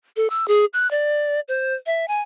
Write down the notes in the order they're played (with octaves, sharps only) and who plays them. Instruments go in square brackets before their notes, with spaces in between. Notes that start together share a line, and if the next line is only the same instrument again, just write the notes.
[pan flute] A4
E6
G#4
F#6
D5
C5
E5
G#5